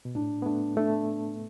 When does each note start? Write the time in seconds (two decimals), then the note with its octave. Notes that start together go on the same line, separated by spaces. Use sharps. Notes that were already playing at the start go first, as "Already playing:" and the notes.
0.05 B2
0.15 A2 D4
0.42 B3
0.45 A3 D4
0.76 A3 D4